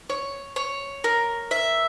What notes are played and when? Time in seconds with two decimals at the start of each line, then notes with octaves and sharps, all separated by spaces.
0.10 C#5
0.56 C#5
1.04 A#4
1.51 E5